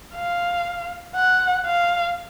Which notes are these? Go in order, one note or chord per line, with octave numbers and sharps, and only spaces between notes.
F5
F#5
F5